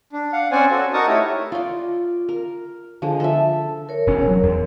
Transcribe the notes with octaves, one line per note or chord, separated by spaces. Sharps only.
D4
F5 F#5
C4 C#4 C5 D5 F#5 G#5
F#4 A4 C5
D#4 F#4 A#4 A5 C#6 D#6
A3 E4 G4 A4 C#5
F4 D5
A#4
D3 F3 G#3
A4 E5
A#4 C#5
E1 C#4
F#3
E2